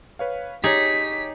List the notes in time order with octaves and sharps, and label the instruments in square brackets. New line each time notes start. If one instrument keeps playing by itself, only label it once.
[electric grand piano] B4 C#5 F5
[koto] D#4 G#4 [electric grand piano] G4 C#5 [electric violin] B6